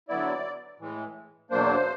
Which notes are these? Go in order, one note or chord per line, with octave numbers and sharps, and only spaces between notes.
D3 F#3 B3 E4 D5
A2 E3 G#3
E2 B2 F#3 A#3 D4 C5